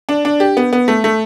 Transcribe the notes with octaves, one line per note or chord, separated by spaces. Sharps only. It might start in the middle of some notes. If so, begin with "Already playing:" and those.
D4
D4
G4
B3
B3
A3
A3